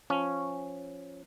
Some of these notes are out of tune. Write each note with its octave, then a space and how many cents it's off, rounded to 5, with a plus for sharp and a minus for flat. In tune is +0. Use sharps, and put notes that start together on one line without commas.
F3 +5 C#4 +0